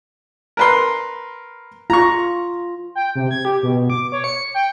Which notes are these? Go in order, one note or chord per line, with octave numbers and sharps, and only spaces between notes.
A#4 B4 C6
F4 A#5 C#6
G5
C3
G#6
G4
B2
D6
C#5
C#7
G5